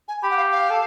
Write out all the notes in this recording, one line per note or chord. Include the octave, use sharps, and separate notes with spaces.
G#5
G4 B5
F#5
F5
F5
A4